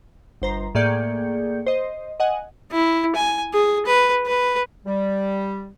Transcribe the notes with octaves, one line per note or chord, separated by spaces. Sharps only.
G1 C5 A#5
A2 A#3 G#4 D5 G6 C#7
C5 D#5
D#5 F#5 G#5
E4
G#5
G#4
B4
B4
G3